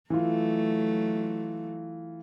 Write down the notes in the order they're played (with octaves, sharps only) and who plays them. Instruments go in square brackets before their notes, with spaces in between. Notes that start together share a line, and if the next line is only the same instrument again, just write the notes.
[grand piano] E3 F4 [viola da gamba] F#3 A3